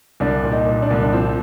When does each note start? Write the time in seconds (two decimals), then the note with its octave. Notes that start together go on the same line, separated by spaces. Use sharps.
0.20 C2 D4
0.43 A#2
0.52 D#4
0.66 A#2
0.82 D4
0.90 C2
1.03 D4
1.13 F3 C4